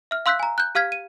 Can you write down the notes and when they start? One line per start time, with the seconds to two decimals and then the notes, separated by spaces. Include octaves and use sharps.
0.11 E5 F6
0.26 F5 C6 E6 F#6 G6 B6
0.40 G#5 A#5
0.58 F#6 G6
0.75 G4 F5 F6 G#6 B6
0.92 D#7